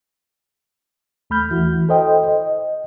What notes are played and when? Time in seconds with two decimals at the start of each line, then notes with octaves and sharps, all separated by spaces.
1.30 D#2 A3 B5 F6 G6
1.50 E3 E4 F#4
1.89 A4 C5 D#5 G5
2.29 D#5